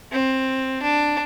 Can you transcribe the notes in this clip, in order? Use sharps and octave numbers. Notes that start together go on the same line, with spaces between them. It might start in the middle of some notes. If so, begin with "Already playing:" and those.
C4
D4